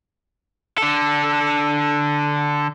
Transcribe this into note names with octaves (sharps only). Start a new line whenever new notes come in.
D3 A4